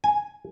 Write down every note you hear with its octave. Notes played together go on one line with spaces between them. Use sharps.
G#5